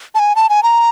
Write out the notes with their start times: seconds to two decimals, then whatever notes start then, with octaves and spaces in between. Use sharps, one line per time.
0.15 A5
0.19 G#5
0.36 A5
0.49 G#5
0.63 A#5